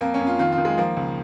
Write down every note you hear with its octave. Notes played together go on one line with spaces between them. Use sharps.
F2 A#3
C#4
F2
F4
D#3 F4
F4
D#3
G#3
F3 A#3
C#2